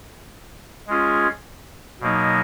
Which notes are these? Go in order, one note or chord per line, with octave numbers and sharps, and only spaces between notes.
G#3 C#4 F4 G#4
B2 F#3 A#3 D#4